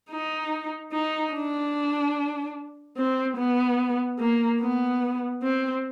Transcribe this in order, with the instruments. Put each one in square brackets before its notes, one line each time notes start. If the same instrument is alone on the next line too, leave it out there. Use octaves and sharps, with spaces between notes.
[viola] D#4
D#4
D4
C4
B3
A#3
B3
C4